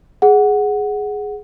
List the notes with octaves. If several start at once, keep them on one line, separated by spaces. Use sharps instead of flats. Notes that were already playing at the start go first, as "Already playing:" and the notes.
G#4 F#5